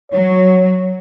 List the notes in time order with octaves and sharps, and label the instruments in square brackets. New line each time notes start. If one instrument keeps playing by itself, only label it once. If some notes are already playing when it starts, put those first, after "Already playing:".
[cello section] F#3 [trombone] C#5